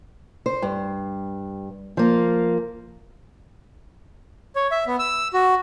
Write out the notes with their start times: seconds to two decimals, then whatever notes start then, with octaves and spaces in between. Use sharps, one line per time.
0.46 C5
0.62 G2
1.97 F3 A#3
4.56 C#5
4.71 E5
4.87 B3
4.99 E6
5.33 F#4